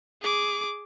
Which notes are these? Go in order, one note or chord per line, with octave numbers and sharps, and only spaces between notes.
G#4 D6